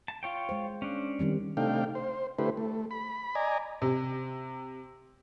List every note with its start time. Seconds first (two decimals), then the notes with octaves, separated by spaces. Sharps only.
0.08 A5
0.23 F4 C#5 G5
0.49 G#3 C5
0.82 C#4 D4
1.19 D#3 G3 C4
1.57 C3 A3 D4 D#4 F5 G5
1.95 C5
2.38 D3 A3 E4 G4 B4 C5
2.57 A3
2.91 B5
3.35 D5 D#5 G#5 A#5
3.82 C3